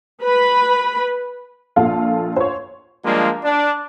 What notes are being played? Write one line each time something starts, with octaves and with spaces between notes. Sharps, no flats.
B4 B5
A#1 A#2 F4 A4 F5
C5 C#5
F3 G3 G#3 A#3 D4 F4
D4